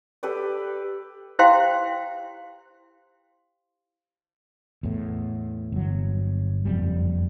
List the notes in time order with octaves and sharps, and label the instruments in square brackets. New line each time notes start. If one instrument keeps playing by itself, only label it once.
[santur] G4 A4 B4 D5
[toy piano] E4 G4 C5 F5 G5 C6
[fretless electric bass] E2 A2
G1 F#3
F#1 F2 G3